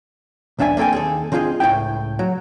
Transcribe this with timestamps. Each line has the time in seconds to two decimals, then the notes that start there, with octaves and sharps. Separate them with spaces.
0.59 B1 E2 D4 E5 G#5
0.77 A#3 C4 A4 G5 G#5
0.93 D#2 G#4 A4
1.32 D3 C4 F4 G#4 D#5
1.60 C#2 A2 C#3 E4 G5
2.19 F#3